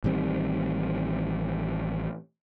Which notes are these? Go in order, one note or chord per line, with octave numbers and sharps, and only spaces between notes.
A1 D#3 G3 C4